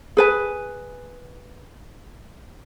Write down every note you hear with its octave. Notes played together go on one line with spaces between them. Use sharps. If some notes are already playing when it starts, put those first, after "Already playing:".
G#4 B4 G#5